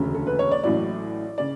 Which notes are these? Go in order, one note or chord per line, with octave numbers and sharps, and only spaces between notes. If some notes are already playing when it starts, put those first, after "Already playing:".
Already playing: E1 D2 C#3
A4
B4
C#5
D5
A1 A2 F#3 D5
C#3 D5